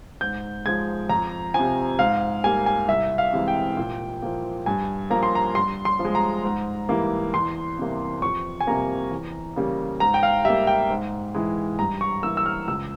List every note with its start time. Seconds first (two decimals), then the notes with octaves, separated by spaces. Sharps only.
0.21 G#2 G6
0.66 F3 G#3 G#6
1.09 F2 A#5
1.54 C3 F3 G#5
1.99 G#2 F5
2.44 G3 A#3 G#5
2.66 G#5
2.88 C2 E5
3.18 F5
3.33 C3 E3 G#3
3.48 G5
3.77 A#2
4.22 F3 A#3
4.66 G2 G#5
5.10 F3 A#3 A#5
5.23 C6
5.35 A#5
5.55 G2 C6
5.85 C6
5.99 F3
6.05 G#3
6.15 A#5
6.44 G#2
6.89 E3 G3 A#3
7.34 E2 C6
7.79 C3 E3 G3 A#3
8.22 F2 C#6
8.61 G#5
8.67 C3 G3 A#3 A#5
9.11 E2
9.56 C#3 G3 A#3
10.00 G#2 A#5
10.14 G5
10.23 F5
10.45 G3 A#3 E5
10.67 G5
10.90 G#2
11.35 E3 G#3
11.79 G2 A#5
12.01 C#6
12.23 E3 A#3 E6
12.37 E6
12.46 F6
12.68 C#2 E6